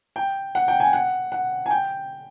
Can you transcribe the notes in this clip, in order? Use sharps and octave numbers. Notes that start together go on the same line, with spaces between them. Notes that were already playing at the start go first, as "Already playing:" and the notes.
G5
F#5
G5
G#5
F#5
F#5
G#5
G5